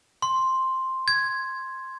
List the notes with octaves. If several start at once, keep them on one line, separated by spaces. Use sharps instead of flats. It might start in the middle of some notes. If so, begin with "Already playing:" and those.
C6
G#6